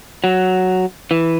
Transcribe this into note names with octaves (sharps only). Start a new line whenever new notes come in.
F#3
E3